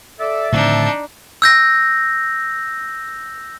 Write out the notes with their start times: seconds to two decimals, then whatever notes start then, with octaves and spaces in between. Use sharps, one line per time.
0.20 A4 D5 E5
0.52 A2 D3 D#3 F3 C4 D4 D#4 A5
1.42 E6 G6 A#6